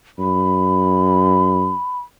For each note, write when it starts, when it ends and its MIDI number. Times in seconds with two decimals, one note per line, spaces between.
0.19 1.73 42
0.19 1.98 83